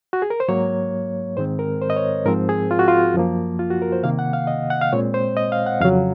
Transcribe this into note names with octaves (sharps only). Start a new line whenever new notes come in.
F#4
G#4
A#4
C5
G#2 F#3 A#3 C#5
G#2 D#3 G#3 C4 C5
A#4
C5
D#5
C#5
G#2 F3 C4 A#4
G#4
F4
F#4
F4
F#2 F3 A#3
F4
F#4
A#4
C5
C3 D#3 A#3 F5
F#5
F5
D#5
F#5
F5
A#2 G#3 C4 C#5
C5
D#5
F5
F#5
F2 C#3 F#3 F5